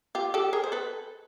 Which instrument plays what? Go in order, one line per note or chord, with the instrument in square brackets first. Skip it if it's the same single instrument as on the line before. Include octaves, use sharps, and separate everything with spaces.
[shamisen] F4 G4
G4 A4
G#4 A#4
C5
A4 B4